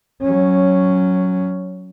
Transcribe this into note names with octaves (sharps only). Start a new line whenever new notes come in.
F#3 C#4